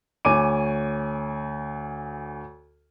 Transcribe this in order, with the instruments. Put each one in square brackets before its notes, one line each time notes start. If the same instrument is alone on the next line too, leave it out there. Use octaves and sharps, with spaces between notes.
[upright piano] D2 C#5 G#5 D6 D#7